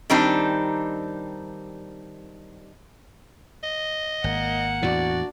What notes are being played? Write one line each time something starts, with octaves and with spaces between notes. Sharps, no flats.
D#3 G3 C4 D4 D#4
D#5
G#1 A#3 F#5
E2 A2 E3 D4 F#4 D5